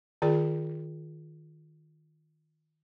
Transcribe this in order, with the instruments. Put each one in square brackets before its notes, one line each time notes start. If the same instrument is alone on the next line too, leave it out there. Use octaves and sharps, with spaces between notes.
[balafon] D#3 F4 G#4 D5 G5